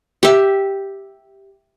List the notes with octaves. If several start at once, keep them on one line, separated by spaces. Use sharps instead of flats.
G4 E5